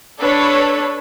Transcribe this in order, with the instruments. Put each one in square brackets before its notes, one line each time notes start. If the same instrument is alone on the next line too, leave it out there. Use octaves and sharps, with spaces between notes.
[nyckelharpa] D4 [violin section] A4 B4 C#5